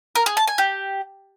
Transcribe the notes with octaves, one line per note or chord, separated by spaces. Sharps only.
A#4
G#4
A5
G#5
G4